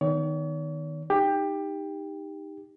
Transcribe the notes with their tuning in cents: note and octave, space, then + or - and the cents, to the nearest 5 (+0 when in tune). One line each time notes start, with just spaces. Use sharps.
D#3 +0 B3 +0 C#5 +45
D#4 +0 G4 +15